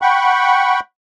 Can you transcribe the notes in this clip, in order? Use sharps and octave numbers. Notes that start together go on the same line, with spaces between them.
F#5 G5 B5 C#6